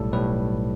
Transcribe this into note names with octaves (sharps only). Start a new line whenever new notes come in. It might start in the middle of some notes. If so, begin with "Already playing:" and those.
Already playing: B1 A2 G3 A4
B1 A2 G3 B4